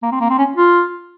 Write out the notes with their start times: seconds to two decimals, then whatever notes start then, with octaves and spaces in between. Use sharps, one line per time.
0.03 A#3
0.12 C4
0.20 A#3
0.30 C4
0.38 C#4
0.56 F4